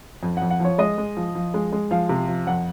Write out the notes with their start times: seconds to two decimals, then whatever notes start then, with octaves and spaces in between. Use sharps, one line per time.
0.23 F2
0.37 F#5
0.42 F2
0.50 F#5
0.60 F3 C#5
0.78 G#3 D#5
0.98 G#3
1.17 F3
1.35 F3
1.54 G#3
1.72 G#3
1.91 F3 F5
2.09 C3
2.28 F3
2.47 F2 F#5